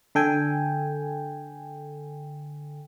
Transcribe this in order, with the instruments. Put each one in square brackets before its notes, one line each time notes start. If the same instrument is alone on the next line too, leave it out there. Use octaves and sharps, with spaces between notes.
[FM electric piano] D3 A4 G5 G#5